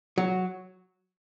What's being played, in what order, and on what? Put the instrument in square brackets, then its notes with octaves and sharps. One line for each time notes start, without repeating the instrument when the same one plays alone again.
[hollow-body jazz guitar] F#3